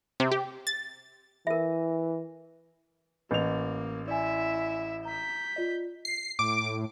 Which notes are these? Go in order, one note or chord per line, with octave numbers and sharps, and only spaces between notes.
C3
G4
A6
E3 A#4 E5
A1 A#3 G6 F7
E4 D5 E5 G#5
A#5 G6 B6
F4 D5 D#5
C7
A2 D6